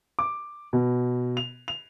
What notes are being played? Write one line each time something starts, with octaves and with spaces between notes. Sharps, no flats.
D6
B2
F7
F7